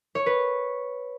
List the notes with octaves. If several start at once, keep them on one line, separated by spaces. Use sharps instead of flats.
C#5
B4